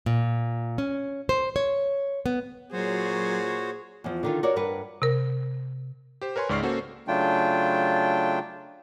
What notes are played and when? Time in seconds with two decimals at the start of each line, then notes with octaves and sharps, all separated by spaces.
0.06 A#2
0.78 C#4
1.29 C5
1.56 C#5
2.26 B3
2.73 A#2 F#3 F#4 G#4 C5 C#5
4.04 E2 F3
4.23 D3 D#3 F4
4.43 F#4 A#4 C#5 D5
4.56 G2 A#4 B4 F#5
5.02 C3 A#4
6.21 G4 C5
6.36 A#4 B4 C#5 G#5 C6
6.49 C#2 G#2 D5 C#6 F6 C7
6.63 A#3 C#4 F#4 A4 C5
7.08 C#3 F#3 A3 D4 F4 G5